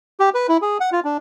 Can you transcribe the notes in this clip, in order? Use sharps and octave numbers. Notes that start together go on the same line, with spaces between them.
G4
B4
E4
G#4
F#5
F4
D4